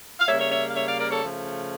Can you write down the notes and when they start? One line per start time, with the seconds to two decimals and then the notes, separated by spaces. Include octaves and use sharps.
0.20 F5
0.28 C#3 G3 A#3 C#5 E5
0.40 C#5 E5
0.52 C#5 E5
0.70 F5
0.75 C#5 E5
0.87 D5 F5
0.99 A#4 D5
1.11 A4 C#5
1.23 C#3 F3 A3